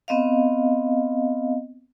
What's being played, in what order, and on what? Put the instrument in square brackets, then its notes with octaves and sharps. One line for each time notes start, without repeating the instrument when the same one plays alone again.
[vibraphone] B3 C4 D#5 F5